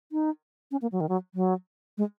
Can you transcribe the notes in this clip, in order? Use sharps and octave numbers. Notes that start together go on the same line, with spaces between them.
D#4
C#4
A#3
F#3
D#3
F#3
F#3
G#3